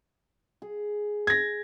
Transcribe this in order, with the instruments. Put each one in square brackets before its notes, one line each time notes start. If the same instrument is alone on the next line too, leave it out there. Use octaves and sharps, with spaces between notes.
[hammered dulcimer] G#4
[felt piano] G#6 A#6